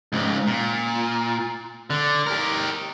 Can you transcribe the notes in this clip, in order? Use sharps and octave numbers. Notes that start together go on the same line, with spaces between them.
C#2 G#2
A#2
D3
G4 A#4